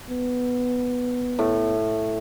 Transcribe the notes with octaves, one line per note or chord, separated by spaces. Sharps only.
B3
A2